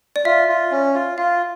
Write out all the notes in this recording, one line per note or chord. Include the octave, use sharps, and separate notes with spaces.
D5
F4 E5
F4
C#4
F4
F4 F5